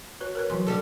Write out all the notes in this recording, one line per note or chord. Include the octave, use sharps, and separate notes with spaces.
F#4 B4 C#5
A#4 B4 C#5
E2 F#3 F#4 C6
D3 G3 A4